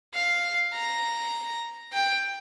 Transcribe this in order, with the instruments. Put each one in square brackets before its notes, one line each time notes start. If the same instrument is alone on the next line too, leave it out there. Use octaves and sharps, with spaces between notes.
[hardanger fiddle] F5
A#5
G5